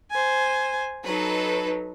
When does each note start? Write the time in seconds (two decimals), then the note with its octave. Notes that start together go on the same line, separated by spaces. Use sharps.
0.11 C5 G#5
1.05 F#3 D#4 A4 B4